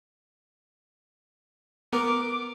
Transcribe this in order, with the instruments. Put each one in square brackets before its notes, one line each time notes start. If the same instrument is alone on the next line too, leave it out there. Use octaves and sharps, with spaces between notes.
[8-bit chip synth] B3 A#4 [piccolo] D6